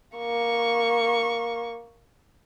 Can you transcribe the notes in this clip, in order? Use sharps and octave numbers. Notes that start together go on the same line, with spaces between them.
A#3 C#6